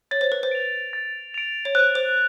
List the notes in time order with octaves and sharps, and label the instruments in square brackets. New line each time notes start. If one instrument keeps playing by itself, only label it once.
[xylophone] C#5 [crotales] A6
[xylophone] C5
B4
C5
[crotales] D7 F7
A6
D7 F7
[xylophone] C#5
[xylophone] C5 [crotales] F#6
[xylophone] C5